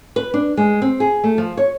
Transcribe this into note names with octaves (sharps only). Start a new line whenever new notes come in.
B4
D4
G#3
C4
G#4
A3
F3
C#5